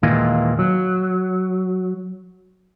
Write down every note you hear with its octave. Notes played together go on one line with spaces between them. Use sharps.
D#2 A#2 E3 G#3 A#3
F#3